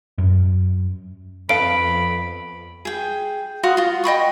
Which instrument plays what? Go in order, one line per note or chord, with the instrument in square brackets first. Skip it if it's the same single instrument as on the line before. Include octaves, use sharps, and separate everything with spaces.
[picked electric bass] F#2
[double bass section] F2 [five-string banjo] B3 A4 F5 [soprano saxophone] B5 [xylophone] D7
[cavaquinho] G#4 G5
F#4 F5 C6 D#6
F4 C6
D#5 G5 B5 C#6